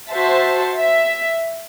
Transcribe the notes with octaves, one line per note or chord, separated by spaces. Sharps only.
F#4 C5 E5 A5
E5